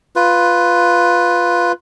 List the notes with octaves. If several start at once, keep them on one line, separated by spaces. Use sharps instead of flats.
F4 B4